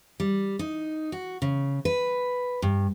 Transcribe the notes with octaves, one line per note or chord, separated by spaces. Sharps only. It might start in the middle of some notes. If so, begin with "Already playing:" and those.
G3
D#4
F#4
C#3
B4
G2